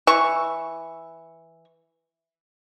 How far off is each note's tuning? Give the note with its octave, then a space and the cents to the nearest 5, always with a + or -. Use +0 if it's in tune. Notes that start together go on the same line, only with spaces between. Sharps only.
E3 +0 C#6 +0